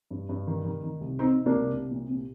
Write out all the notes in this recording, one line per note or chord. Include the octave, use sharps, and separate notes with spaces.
G2
G2
D#3
D#3
D#3
C2
C3 C4 D#4
C3
A#3 D4
C2
C2
A#2
A#2